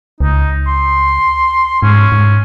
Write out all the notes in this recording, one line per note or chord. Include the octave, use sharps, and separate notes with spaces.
C#2 D#4
C6
G#2 C#4
G#2